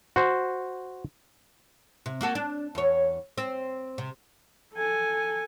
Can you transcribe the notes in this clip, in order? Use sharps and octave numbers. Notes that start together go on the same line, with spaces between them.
F#4 C5
C3
A#3 F#4 A4
D4
E2 C#5
C4
C3
A4 G#5